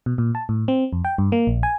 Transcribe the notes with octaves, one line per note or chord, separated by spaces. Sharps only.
B2
A#2
A5
A2
C4
F2
G5
G2
A#3
A#1
G#5